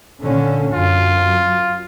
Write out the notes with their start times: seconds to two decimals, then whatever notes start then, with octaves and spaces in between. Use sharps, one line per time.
0.22 A#2 D3 C#4
0.73 F#2 F4